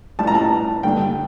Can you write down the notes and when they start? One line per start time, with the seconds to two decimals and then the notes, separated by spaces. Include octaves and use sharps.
0.19 A2 G3 A5
0.27 A#5
0.35 A5
0.83 G2 D3 G3 G5